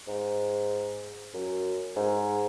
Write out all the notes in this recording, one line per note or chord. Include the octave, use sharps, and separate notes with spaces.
G#2
F#2
G#2